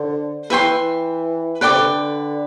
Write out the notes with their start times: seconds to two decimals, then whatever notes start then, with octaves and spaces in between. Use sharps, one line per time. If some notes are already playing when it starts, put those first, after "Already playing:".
Already playing: D3 C5
0.50 E3 B4 E5 G5 C6
0.71 E3
1.61 D3 B4 D5 G5 D6
1.70 C3
1.77 D3